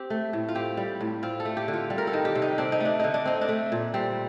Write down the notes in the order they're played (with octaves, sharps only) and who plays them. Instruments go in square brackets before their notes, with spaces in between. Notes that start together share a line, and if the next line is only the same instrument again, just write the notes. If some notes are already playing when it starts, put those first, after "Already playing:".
Already playing: [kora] C4 G4
A3
A2
F4
C4 G4
G3
A2
C4 F4
A4
A3
G4
D3
F4
G3
A#4
A4
D#3
G4
C3
D#4
C4 D4
D#4
A3 D4
D3 D#4
D4
C4 D#4
D4
A3
A#2
G3 C4